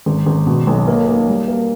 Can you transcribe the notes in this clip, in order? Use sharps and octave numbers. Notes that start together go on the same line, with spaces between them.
G#1
G#1
B2
B1
A#3
A#3
G3
A#3